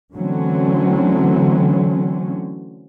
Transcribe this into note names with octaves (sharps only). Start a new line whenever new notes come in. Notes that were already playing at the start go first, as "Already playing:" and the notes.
D3 E3 F#3 A3 C4 C#4